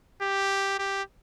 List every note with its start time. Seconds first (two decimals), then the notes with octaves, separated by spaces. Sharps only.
0.22 G4
0.79 G4